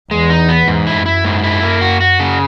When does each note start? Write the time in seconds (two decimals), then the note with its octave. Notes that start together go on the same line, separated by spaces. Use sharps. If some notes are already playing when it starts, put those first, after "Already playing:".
0.11 E2 G#3
0.30 D#4
0.49 B3
0.68 E2 G#2
0.87 E4
0.96 F#2
1.06 E4
1.25 G#2
1.44 E4
1.63 A#3
1.81 F#4
2.00 F#4
2.20 C#3